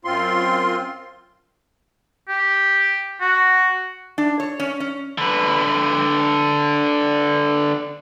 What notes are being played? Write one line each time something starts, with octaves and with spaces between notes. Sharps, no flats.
F#2 C4 F4 C6
G4
F#4
D4
C#5
C#4
C#4
D3 B4